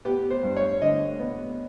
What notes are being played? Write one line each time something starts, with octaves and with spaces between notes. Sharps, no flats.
B3 G4
C5
G2
C#5
D3 D#5
B3